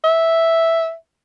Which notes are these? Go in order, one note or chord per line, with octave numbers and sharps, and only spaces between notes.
E5